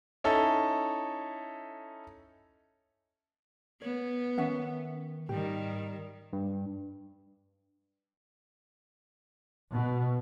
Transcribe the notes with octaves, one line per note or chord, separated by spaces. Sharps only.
C#4 D#4 E4 A4
B3 C#5
D#3 C#4 E5 F#5
G#2 D#3 G3 G4
G2
B2